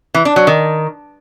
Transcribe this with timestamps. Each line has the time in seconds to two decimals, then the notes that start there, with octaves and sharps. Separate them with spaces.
0.14 E3
0.25 D4
0.36 F#3
0.47 D#3